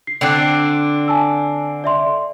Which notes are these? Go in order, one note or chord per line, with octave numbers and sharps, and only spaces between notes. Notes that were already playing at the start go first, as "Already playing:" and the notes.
C7
D3 C4 D4 G5 F#6
G#5 A5 E6
D5 E5 C6